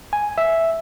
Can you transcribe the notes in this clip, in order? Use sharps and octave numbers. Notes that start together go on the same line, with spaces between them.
G#5
E5